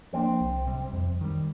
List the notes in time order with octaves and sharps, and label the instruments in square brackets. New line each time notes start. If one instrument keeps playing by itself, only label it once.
[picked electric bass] F3 A#3 D4 [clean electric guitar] C4
[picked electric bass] C2
C3 G3
F2
D#3 G3